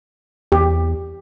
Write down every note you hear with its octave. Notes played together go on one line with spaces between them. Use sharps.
E2 G4